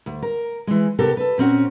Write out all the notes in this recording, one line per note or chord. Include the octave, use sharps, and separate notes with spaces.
D2
A#4
E3 G#3
C3 B3 G4 A4 A#4
A4 B4
A#2 C4 C#4 F#4